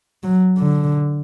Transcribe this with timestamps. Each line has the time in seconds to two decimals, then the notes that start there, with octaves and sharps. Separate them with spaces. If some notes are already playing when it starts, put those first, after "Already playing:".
0.23 F#3
0.58 D3